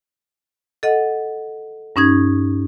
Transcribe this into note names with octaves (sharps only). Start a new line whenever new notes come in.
A4 D#5 F#5
G2 C#4 D#4 G#6